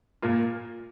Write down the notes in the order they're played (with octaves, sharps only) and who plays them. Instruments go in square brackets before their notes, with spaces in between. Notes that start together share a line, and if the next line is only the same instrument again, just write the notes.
[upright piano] A#2 A#3 F4